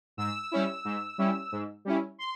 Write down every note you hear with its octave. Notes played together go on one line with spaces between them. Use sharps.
G#2 E6
G3 C#4 E4
G#2
G3 C#4 E4
G#2
G3 C#4 E4
C6